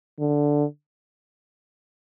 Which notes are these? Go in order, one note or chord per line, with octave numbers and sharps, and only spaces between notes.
D3